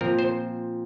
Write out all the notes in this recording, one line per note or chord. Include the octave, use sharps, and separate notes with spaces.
A#2 F3 C4 A#4
C5